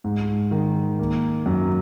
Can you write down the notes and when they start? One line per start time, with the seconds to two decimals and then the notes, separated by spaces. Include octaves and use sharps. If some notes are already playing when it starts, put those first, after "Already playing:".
0.04 G#2
0.51 D#3
0.99 A#3
1.46 F#2